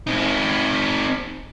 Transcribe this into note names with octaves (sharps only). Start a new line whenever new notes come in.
C4 D#4